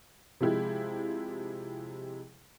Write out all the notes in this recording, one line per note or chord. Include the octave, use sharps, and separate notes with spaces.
C3 F3 G#3 E4 G4